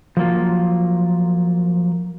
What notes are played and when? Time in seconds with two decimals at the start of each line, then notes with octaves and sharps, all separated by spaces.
0.17 F3 F#3 A#3 F4